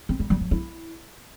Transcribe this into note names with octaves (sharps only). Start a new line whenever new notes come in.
C4
G3
G3
F#3
E4